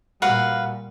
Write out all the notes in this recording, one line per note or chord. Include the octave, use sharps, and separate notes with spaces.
A#2 G3 F#4 B4 F5